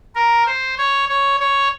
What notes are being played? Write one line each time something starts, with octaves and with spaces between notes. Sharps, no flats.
A#4
C5
C#5
C#5
C#5